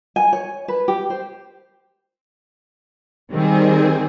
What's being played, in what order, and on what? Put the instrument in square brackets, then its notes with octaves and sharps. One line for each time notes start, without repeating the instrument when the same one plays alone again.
[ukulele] G#5
C#5
B4
G4
C5
[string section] D#3 G3 C4 G#4